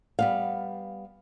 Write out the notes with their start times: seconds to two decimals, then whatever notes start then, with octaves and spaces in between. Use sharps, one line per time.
0.19 G3 B3 F5